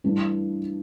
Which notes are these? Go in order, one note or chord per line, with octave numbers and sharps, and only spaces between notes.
G2 E3 A3